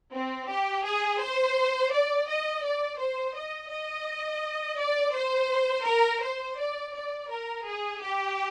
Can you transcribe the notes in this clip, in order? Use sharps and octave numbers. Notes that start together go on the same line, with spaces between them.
C4
G4
G#4
C5
D5
D#5
D5
C5
D#5
D#5
D5
C5
A#4
C5
D5
D5
A#4
G#4
G4